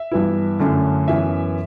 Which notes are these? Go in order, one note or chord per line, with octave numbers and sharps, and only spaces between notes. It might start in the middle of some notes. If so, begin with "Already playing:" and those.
Already playing: E5
G2 E3 B3 E4
F#2 D3 A3 C#4 E4
F#2 E3 B3 E5